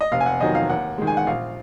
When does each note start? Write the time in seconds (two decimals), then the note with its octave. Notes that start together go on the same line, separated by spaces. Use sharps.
0.01 D#5
0.12 F1 F5
0.21 G#5
0.26 F#5
0.40 F2 D#3 F#3 D#5
0.55 F5
0.70 D#2 F#5
0.98 D#3 G#3
1.07 G#5
1.17 F#5
1.27 A#1 F5